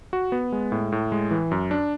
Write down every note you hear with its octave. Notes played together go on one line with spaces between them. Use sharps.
F#4
B3
G#3
A2
A2
G#3
E3
F#2
D4